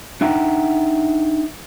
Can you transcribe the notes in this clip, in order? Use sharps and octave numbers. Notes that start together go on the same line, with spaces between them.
D4 D#4 E5 F#5 G5 A#5